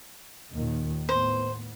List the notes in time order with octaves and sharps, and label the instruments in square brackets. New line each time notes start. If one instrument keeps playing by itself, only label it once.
[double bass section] D#2 A#2 D#3
[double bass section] A2 B3 [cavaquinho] C5